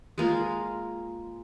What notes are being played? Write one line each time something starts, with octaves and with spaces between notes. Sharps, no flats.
G#3 A#3 F4